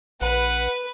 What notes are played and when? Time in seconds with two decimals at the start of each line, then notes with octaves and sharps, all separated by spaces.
0.22 A#1 B4 F#5